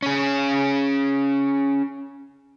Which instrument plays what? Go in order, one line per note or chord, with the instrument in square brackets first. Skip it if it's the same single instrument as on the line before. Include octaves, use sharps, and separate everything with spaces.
[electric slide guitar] C#4 G#4